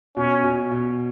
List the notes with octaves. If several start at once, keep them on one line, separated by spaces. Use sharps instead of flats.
B2 C#4
B2
B2